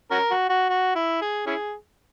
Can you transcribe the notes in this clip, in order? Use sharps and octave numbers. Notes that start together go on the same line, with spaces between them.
C#4 F#4 A#4
F#4
F#4
F#4
E4
G#4
C#4 E4 G#4